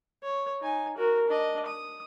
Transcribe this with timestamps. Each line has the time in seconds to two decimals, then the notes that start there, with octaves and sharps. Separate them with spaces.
0.23 C#5
0.61 D#4 G#5
0.97 F#4 A#4
1.27 D4 D#5
1.66 D#6